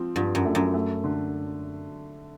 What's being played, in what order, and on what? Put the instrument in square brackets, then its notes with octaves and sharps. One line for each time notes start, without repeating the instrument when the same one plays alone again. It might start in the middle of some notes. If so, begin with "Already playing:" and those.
Already playing: [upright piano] F3 C4
[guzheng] G2 [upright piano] F3
[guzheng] F#2
[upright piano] A3
[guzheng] F#2
[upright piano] A3
D3